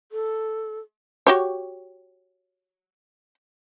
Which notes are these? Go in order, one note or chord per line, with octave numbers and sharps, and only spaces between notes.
A4
F#4 G4 C#5